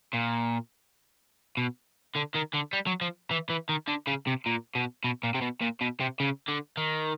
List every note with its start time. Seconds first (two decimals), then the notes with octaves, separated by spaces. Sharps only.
0.13 A#2
1.57 B2
2.15 D3
2.34 D#3
2.53 D3
2.73 G3
2.87 F#3
3.01 F3
3.31 E3
3.50 E3
3.69 D#3
3.88 D3
4.07 C#3
4.27 C3
4.46 A#2
4.75 B2
5.04 B2
5.24 A#2
5.35 C3
5.42 B2
5.62 A#2
5.81 B2
6.00 C3
6.20 C#3
6.48 D3
6.77 D#3